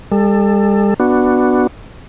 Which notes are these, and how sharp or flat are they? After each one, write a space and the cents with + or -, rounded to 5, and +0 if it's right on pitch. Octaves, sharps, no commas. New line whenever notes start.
G3 +45 A4 +15
B3 +0 D4 +10 F#4 +0